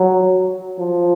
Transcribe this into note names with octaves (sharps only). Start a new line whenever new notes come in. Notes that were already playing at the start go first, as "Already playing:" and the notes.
Already playing: F#3
F3